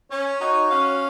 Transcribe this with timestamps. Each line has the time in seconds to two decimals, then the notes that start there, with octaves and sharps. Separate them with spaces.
0.10 C#4 C#5
0.41 D#4 F#4
0.70 C#4 F5